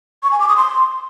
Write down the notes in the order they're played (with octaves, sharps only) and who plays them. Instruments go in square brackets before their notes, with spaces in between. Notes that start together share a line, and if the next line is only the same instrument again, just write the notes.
[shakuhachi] C#6
G#5
D6
D#6
C6